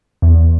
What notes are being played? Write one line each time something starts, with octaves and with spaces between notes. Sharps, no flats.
E2